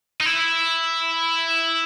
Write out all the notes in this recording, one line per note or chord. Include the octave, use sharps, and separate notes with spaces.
D#4
E4